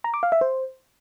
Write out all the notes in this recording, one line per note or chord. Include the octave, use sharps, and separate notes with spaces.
A#5
D6
F5
E5
C5